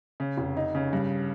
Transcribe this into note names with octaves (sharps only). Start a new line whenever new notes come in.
C#3
F1
D#4
C#3
G2